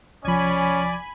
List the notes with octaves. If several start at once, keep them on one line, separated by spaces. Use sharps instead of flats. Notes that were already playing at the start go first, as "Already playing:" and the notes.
C2 F3 C#4 D5 G#5 B5